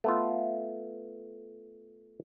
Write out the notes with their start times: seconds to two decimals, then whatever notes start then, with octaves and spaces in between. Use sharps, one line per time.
0.04 A3 B3 F4